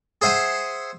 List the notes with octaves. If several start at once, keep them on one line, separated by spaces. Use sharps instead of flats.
G#4 C5 E5 F#5 G#5